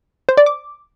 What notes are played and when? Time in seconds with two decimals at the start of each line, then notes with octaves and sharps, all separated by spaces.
0.29 C5
0.37 D5
0.46 D6